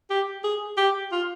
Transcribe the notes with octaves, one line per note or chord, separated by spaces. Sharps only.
G4
G#4
G4
F4